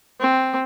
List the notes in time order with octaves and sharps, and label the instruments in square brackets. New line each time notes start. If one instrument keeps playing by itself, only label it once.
[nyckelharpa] C4